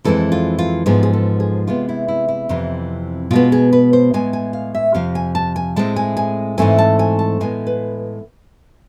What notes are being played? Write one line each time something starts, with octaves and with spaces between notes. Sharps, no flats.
F2 E3 G#3 C4 A4
F4
F4
G#2 F3 B3 G#4
G#4
A4
G#4
C3 G#3 B3 F4
E4
E4
E4
F2 C3 E3
B2 G#3 B3 F4
G#4
B4
C5
A2 G#3 B3 G#5
G#5
F5
E5
F2 C3 F3 F5
G#5
A5
G#5
A2 G#3 C4 A5
G#5
G#5
G#2 E3 A3 C4 G#5
A5
G#5
A5
A2 G#3 B3 G#5
B4